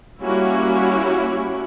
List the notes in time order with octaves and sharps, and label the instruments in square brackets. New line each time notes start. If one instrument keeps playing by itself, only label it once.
[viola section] G3 A#3 C#4 E4 F#4